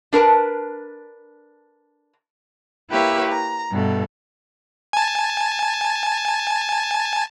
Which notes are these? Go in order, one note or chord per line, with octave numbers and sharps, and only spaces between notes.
D4 A#4 B4 A5
A#3 E4 G4 B4 C#5 E5
A#5
G2 B2 A3
G#5 A5